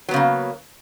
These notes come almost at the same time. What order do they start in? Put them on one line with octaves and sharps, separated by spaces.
F#3 B3 C#3 A#3